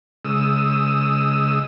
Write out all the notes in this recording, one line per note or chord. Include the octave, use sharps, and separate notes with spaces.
C#3 G#3 D#6 E6